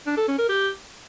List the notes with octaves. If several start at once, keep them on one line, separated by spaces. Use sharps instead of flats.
D4
A4
C#4
A#4
G4